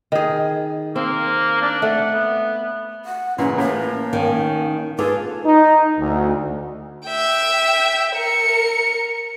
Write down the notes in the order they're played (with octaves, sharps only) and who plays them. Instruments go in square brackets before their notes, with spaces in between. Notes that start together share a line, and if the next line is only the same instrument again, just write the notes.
[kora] D#3 G#4
[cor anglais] A#3 [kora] C4
[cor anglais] D4
[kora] A3 [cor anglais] F#5
[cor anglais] B3
[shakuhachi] F#5
[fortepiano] A#2 C#3 [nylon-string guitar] E3 [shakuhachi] C#4
[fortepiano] A2 [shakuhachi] A#3
[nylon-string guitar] D#3 C#4
[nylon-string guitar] F4 [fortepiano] G#4 A4 D6 [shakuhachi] B4
[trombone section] D#4
D2
[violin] E5 G5
A#4 C#7